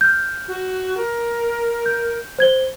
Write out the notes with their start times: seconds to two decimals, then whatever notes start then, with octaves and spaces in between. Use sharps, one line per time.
0.01 F6 G6
0.48 F#4
0.97 A#4
1.86 G6
2.39 C5 G#6 G7